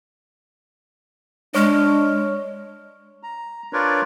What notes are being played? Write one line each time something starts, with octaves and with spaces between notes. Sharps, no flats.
G#3 D4 C#5 C#6 F6
A#5
D4 F4 A#4 B4 C#5 D5